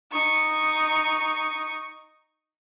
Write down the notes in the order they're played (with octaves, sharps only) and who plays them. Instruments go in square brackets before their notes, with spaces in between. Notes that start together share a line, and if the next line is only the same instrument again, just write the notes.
[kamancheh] D#4 C#6